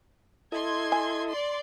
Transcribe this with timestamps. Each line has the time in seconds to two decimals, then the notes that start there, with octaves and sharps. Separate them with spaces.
0.52 E4 A4 D#5 C6 G#6
0.92 G#5
1.29 D5 C6